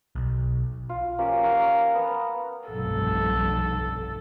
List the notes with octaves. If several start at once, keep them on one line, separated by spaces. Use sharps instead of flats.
B1
F4
F3 A#3 C#4 G4
A#4 C#5 F5 F#5
A#5
B3 A#5
F1 B1 G2 A4